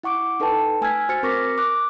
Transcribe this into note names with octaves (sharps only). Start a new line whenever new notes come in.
E4 F#5 C#6 D6 D7
D#4 A4 B4 G5 A5
A3 G#5 E6 F6 G#6 B6
F#4 C5 F6 A6 C#7
C4 A#4 C#6 D6 A#6 B6
D6 F#6